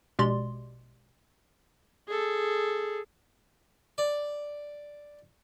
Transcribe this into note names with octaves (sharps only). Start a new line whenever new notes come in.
A#1 B2 G#3 G4 D5 C6
G#4 A4
D5